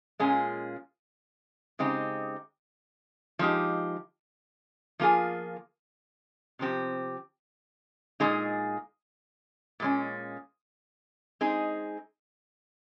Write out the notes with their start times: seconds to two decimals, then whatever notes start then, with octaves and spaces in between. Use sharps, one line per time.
0.19 A#2 G#3 C#4 F4 G#4
1.79 C#3 G#3 C4 D#4 G4
3.39 F3 G#3 D#4 G4
5.00 F3 A#3 F4 G#4
6.59 C3 F3 C4 G4
8.20 A#2 G#3 D#4 G#4
9.80 A#2 G#3 C#4
11.41 G#3 C4 D#4 G#4